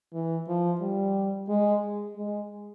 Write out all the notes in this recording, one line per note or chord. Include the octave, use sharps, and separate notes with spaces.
E3
F3
G3
G#3
G#3